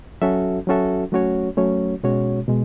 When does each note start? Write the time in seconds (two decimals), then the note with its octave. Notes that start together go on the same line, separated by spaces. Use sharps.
0.22 F#3 C#4 F#4 A4 E5
0.67 F#3 C#4 F#4 A4 E5
1.12 F#3 A3 C#4 F#4 C#5
1.57 F#3 A3 C#4 F#4 C#5
2.03 B2 G#3 C#4 F#4 C#5
2.48 B2 G#3